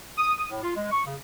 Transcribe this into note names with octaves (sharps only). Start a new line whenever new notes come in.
D#6
D#6
A2
F4
G#3
C#6
C#3